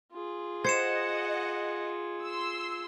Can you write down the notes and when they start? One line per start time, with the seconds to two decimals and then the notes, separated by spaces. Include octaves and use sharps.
0.12 F4 G#4
0.65 C5 D#5 F#5 G#6 C#7 E7
2.25 C6 E6